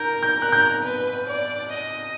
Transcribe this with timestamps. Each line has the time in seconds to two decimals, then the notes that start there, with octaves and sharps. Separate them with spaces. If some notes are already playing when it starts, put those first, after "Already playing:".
Already playing: A#4 G6
0.23 G6
0.37 A#4 F#6
0.53 G6
0.84 B4
1.29 D5
1.75 D#5